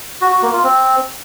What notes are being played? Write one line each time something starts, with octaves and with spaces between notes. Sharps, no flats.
F#4
F#4
A#3
F4
C4